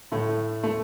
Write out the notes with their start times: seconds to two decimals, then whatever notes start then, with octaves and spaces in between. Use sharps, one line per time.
0.12 A2 A3
0.63 A3